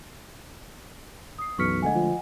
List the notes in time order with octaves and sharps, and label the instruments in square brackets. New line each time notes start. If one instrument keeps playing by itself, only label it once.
[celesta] D#6 C7
[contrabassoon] B1 [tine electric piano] F#2 E3 B6 [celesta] C#6 F6 C#7
[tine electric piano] D3 G#3 A3 [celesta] D#5 F#5 G#5
[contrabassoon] F3